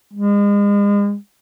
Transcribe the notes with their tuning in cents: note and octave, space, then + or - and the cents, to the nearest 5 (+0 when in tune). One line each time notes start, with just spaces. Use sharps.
G#3 -35